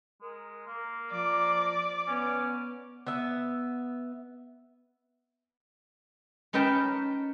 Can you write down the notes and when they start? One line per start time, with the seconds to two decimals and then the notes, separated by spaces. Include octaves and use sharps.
0.21 G#3 A#4
0.67 A#3
1.11 F3 D5
2.08 B3 C#4
3.07 B3 E5
6.53 C#4 D#4 A#4 B4 G5 A5